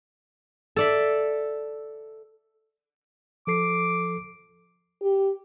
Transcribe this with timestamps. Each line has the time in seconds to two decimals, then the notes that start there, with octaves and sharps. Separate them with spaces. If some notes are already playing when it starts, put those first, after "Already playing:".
0.76 A4 D5 E5
3.47 F3 A4 D6 C7
5.02 G4